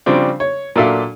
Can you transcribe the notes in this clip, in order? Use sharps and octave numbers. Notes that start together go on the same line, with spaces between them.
C#3 F3 G3 C4 D4
C#5
A#2 F#3 D4 A4 E5 F5